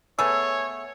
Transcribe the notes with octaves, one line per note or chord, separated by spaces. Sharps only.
A3 B3 G#4 C#5 E6